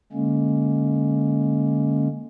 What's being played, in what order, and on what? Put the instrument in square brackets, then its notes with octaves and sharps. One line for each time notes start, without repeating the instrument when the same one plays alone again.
[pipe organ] D3 G#3 A#3 C#4